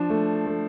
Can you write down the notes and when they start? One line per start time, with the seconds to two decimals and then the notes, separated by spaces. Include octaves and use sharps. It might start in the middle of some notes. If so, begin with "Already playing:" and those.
Already playing: F3 D4
0.10 A3
0.47 A3